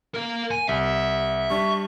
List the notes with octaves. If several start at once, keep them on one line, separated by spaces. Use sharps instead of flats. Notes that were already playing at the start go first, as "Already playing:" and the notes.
A#4 F5
G#5
C2 E5
G3 D4 C#6